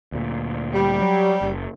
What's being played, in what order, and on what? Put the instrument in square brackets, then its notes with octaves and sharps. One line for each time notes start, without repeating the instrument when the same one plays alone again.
[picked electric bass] D2 A#2
[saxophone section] G3
[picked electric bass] F#3
F#1